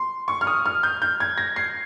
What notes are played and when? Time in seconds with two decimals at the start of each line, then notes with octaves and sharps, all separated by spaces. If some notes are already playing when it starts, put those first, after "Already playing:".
Already playing: C6
0.28 C#6
0.41 F6
0.47 D#6
0.66 F6
0.83 G6
1.02 G6
1.20 G#6
1.38 A#6
1.56 C7